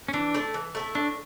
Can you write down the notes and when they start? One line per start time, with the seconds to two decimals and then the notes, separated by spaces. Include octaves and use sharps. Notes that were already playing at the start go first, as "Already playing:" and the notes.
0.08 C#4
0.13 E3 D4
0.34 A3 E4 A4
0.54 E3
0.75 A3 E4 A4
0.95 A2 D4